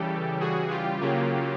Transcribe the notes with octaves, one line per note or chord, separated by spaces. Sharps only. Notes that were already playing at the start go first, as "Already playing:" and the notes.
Already playing: C#3 E3 G3 G4 A4
F#4 G#4
F4 G4
C#3 F#3 A#3